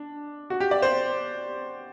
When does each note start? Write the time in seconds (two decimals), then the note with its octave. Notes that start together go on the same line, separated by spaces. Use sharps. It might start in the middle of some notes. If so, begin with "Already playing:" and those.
Already playing: D4
0.50 F#4
0.60 G4
0.71 D5
0.82 C5